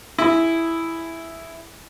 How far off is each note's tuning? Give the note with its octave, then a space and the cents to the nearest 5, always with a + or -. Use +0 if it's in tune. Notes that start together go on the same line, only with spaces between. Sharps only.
E4 +0 G#4 +0